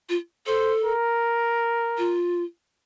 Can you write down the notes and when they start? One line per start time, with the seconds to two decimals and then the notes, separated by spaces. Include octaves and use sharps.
0.09 F4
0.47 A4 C5
0.85 A#4
1.98 F4